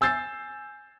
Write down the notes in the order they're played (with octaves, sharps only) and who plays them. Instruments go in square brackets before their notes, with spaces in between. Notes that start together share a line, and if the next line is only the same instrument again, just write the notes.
[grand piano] G#5 E6 G6 A6 C7